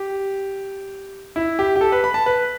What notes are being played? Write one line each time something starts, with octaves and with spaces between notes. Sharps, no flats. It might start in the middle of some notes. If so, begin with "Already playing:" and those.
Already playing: G4
E4
G4
G4
A4
B4
B5
A5
B4